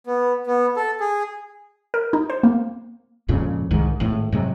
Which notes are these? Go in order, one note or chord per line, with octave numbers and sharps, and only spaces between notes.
B3
B3
A4
G#4
A#4
D#4
C5
A#3
G#1 F2 A#2 C#3
C2 G#2 D#3
G#1 A2
G#2 C3 F#3